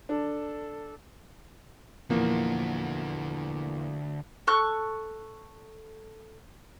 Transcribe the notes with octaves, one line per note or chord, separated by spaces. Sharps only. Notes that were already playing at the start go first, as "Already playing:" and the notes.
D4 A4
E2 A#2 D3 F3 A#3 F#4
A4 C#6 F#6